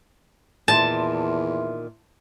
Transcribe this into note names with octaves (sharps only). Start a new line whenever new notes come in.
E2 A#2 D#3 E5 A5 C6